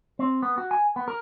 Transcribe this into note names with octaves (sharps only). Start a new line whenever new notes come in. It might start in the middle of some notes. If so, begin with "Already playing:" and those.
C4
B3
F#4
G#5
B3
A#4